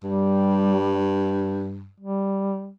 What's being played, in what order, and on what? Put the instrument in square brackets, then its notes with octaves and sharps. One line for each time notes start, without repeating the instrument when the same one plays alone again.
[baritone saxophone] G2 [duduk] G3
[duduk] G3